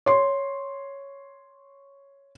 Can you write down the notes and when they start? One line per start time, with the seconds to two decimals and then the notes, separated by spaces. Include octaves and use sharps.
0.06 C#5 C6